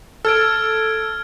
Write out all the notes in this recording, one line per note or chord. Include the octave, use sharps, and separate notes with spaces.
A4 F6 G#6 D7